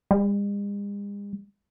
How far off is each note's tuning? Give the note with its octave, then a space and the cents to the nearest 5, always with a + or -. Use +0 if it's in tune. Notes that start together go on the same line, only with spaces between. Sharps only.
G#3 -45